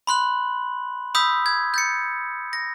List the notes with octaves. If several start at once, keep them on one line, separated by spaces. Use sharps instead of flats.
B5 C6 F#6 F#7
B5 D#6 E6 G6 B6
G#6
G6 A6 C#7
A#6